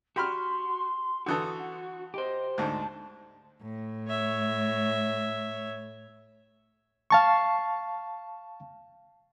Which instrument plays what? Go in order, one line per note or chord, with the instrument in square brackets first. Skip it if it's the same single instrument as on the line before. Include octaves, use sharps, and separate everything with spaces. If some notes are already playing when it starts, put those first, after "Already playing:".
[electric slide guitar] F#4 [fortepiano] G4 B5 F6 [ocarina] C6
[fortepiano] D3 E3 A4 [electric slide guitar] F#4 [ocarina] D#6
[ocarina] F#5
[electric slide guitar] G4 C5 [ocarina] D#5
[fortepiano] D2 G#2 [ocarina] A5
[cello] A2
[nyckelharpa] C#5 E5
[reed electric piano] F5 A5 C#6